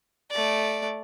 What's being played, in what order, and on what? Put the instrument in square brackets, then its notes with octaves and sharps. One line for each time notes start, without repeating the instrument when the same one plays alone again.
[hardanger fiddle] A3 D5